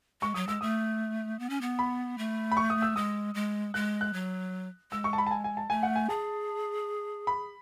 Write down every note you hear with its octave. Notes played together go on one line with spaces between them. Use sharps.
G#3 C#6
F#3 D#6
G#3 E6
A3 D#6
B3
C#4
B3
B5
A3
B5
C#6
D#6
E6
G#3 D#6
G#3
G#3 F#6
F#6
F#3
G#3 E6
C#6
A5
B5
A5
G#5
G#5
A5
A3 G#5
F#5
G#5
G#4 A5
B5